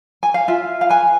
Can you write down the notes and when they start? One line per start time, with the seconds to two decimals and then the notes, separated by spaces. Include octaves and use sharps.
0.23 G#5
0.34 F5
0.48 F4 E5
0.81 F5
0.89 B4 G#5